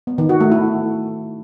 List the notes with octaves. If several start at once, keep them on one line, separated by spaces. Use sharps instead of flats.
B3
D#3
F#4
A3
E4